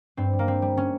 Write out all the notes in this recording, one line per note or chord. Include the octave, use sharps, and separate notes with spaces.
G2 C4
G3
A#3
G3 C4
G3
C#4